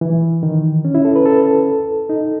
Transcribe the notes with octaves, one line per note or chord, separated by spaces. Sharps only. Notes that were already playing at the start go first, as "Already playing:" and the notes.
E3
D#3
C#4
E4
A4
B4
A4
D#4